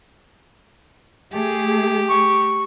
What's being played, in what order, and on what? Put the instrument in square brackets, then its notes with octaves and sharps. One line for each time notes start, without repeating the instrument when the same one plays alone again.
[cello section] A3 G#4 [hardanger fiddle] G4
[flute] C#6